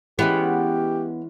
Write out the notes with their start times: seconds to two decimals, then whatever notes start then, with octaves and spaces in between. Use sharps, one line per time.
0.19 E3 G#3 B3 C#4 G4